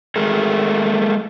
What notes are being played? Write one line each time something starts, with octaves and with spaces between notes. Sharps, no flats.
G#3 A3 G#4 A#4